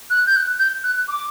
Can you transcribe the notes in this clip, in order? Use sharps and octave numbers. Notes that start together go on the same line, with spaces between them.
F#6
G6
F#6
G6
F#6
D6